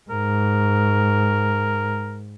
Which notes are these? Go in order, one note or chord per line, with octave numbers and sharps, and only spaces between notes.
G#2 A#4